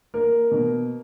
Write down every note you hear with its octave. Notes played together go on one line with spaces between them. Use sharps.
A#3 A#4
B2